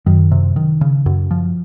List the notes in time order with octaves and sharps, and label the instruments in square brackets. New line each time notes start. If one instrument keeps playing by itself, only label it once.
[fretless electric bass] F#2 [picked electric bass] D#3
[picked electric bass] C3
D#3
C#3
F#2
F3